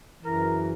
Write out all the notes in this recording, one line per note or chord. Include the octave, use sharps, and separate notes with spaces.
F#2 C#3 E3 A#4